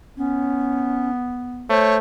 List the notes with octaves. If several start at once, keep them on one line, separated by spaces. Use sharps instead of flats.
B3 C#4
A3 C5 C#5